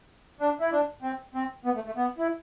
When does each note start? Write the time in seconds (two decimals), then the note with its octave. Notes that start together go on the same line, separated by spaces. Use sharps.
0.40 D4
0.60 E4
0.72 D4
1.02 C4
1.34 C4
1.65 B3
1.75 A3
1.86 A3
1.97 B3
2.18 E4